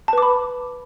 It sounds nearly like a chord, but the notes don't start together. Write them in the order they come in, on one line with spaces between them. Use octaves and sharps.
A5 B4 D6 B5